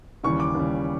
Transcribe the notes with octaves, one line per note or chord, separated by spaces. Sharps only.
D#2 C#3 E3 G3 C#6
D6
D#2 C#3 E3 G3